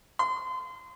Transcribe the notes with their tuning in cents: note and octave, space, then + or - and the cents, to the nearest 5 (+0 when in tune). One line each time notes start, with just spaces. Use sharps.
C6 -30